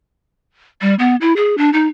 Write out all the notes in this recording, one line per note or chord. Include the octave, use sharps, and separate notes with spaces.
G3
B3
E4
G#4
D4
D#4